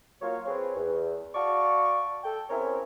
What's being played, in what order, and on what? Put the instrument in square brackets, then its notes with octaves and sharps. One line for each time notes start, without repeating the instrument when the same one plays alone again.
[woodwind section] F#3 A#3 F4 C#5
C4 G#4 B4 C#5
E2
F#4 D5 F5 A5 C#6
A4 G5
C4 C#4 E4 G#4 A#4 C#5